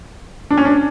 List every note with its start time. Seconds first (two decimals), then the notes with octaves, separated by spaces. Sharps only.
0.50 D4
0.58 C#4
0.65 D4